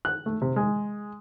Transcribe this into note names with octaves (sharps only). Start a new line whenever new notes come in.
F#6
A3
C3
G#3